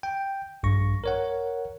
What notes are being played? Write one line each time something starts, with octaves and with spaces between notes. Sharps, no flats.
G5
A#1 G2 C#6 A#6
A#4 C#5 F#5